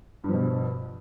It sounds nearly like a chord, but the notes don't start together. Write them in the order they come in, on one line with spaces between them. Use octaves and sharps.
G2 F3 B2